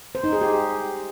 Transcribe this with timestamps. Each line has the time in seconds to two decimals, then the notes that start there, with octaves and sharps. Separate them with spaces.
0.15 C5
0.24 D#4
0.33 G#4
0.42 G4